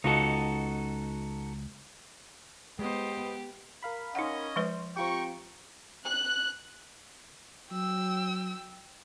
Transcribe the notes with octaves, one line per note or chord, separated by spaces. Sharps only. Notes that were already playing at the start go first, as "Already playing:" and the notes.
C#2 D#4 F#4 A4
G#3 B3 G4 C5 D#5
A#4 F5 B5
C#4 D#4 D#5 F#5
F3 G#3 B4 C5
C4 F4 G4 G5 A#5 C#6
F#6
F#3 G5 E6